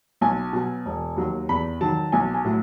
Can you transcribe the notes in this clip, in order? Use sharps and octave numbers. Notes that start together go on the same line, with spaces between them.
B1 G#5
B2 F#3
E1
D#2 D#3 F#3
E2 B5
D#3 F#3 A5
B1 G#5
G#5
A2 F#3